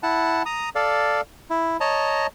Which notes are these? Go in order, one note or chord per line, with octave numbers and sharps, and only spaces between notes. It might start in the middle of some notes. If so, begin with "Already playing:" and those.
E4 F#5 A5
A#5 D#6
A4 D5 F5
E4
C#5 D#5 A5 A#5